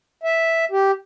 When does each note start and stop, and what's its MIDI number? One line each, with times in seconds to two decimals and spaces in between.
0.23 0.65 76
0.72 0.92 67